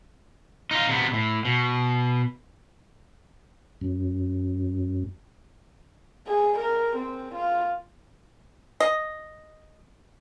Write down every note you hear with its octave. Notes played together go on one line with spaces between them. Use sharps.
D#4 F4
C3 B3
A2
B2
F#2
G#4
A#4
C4
F4
D#5